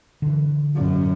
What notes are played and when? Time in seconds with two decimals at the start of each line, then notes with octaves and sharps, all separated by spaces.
0.22 D3 E3
0.75 F#2